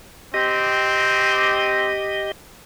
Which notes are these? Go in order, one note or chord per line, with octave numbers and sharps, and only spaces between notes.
C4 G4 D#5